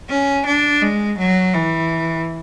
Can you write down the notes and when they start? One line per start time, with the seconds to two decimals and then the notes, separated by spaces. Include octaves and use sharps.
0.09 C#4
0.46 D4
0.82 G#3
1.18 F#3
1.54 E3